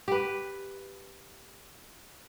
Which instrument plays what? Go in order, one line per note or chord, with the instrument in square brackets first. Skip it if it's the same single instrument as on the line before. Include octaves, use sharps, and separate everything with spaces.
[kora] G4 B4